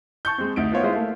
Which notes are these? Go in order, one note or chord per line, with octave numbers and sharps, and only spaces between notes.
A5 C#6 G6
G#3 C4
D2 D#4 D7
B3 D#4 F4 C5 C#5 F#5
G#3 E4 F4 C5
A3 A#3